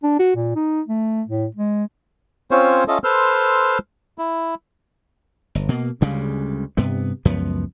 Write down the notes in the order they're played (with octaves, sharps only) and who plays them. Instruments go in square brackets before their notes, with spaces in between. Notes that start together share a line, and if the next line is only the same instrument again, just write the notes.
[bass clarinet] D4
F#4
A#2
D#4
A3
A2
G#3
[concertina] C4 C#4 F4 C5 C#5
C#4 F4 A4 D#5 E5
A4 B4 C5 C6 E6 F6
E4
[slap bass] G1
B2 A#3
D2 C#3 G3 G#3
G2 C3 B3
C#2 F#2 F3 B3